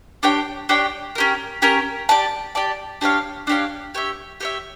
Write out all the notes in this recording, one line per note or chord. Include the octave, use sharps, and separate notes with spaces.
D4 G4 C#5 G5
D4 G4 C#5 G5
C#4 G4 A#4
C#4 G4 A#4
G4 D5 A5
G4 D5 A5
D4 G4 C#5 F5
D4 G4 C#5 F5
G4 C#5 E5
G4 C#5 E5